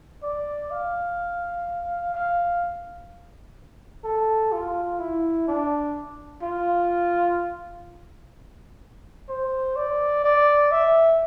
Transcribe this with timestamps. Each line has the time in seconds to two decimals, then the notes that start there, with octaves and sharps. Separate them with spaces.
0.23 D5
0.71 F5
2.14 F5
4.04 A4
4.52 F4
4.99 E4
5.48 D4
6.42 F4
9.29 C5
9.76 D5
10.24 D5
10.72 E5